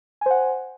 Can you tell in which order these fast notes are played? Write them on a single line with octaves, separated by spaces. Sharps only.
G#5 C5 F#5